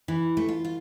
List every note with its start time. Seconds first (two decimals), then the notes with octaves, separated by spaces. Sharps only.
0.08 E3
0.37 A3
0.48 F4
0.65 F4